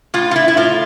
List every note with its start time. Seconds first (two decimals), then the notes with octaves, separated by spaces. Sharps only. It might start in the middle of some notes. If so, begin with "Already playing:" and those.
0.14 A2 F4
0.31 F4
0.36 E4
0.48 E4
0.57 A2 F4